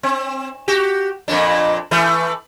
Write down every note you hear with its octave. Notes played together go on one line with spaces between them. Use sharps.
C4
F#4 G4
F2 A#2 D4
E3 A3